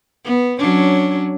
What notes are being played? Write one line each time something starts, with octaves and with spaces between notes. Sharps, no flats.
B3
F#3 C#4 D4